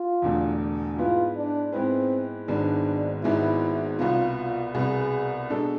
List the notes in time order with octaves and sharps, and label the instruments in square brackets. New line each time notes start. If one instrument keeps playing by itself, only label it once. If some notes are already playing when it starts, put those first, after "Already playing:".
Already playing: [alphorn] F4
[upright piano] E1 E2 D3 A3
[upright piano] G#2 G#3 B3 E4 B4 [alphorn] F4
[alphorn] D4
[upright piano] G#2 G#3 B3 E4 B4 [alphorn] C4
[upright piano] G#1 G#2 G#3 B3 [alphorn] D4
[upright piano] G#1 G#2 G#3 B3 [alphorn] E4
[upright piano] C2 B2 B3 [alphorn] F4
[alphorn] F4
[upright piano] C2 B2 B3 [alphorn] G#4
[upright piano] B2 G#3 D4 A4